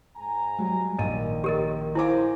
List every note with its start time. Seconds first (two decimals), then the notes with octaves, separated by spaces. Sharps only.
0.17 G#2 G#5 A#5
0.58 F#3 G3
0.99 A#1 D#3 D#5 D#7
1.44 G4 A#4 D#5
1.95 E4 A#4 C5 F5 G#5 D6